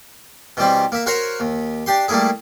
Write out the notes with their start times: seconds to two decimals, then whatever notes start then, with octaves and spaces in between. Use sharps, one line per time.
0.57 B2 E3 G3 C4
0.92 A#3 E5
1.06 F#4 A#4 C5 C#5 F#5 A#5
1.40 D#2
1.86 D4 G4 C6
2.08 G3 A3 A#3 E4 G#4